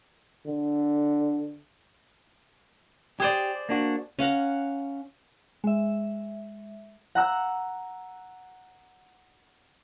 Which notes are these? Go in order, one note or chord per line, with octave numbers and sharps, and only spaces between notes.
D3
G4 G#4 C5 D5
A#3 D4 F#4
C#4 F5 F#5 A#5
G#3 E5
F#5 A#5 E6 F#6